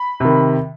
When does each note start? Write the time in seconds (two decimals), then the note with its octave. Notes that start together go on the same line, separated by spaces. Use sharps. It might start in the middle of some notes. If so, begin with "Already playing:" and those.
Already playing: B5
0.20 C3 D#3